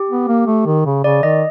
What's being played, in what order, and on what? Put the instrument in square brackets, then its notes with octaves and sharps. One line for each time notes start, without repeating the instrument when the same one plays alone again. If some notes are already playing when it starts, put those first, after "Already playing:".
Already playing: [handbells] G4
[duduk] B3
A#3
A3
D#3
C#3
[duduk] C#3 [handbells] D5
[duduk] D#3 [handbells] D#5